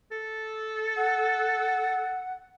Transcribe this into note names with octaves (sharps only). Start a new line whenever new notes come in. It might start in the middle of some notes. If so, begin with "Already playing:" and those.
A4
F#5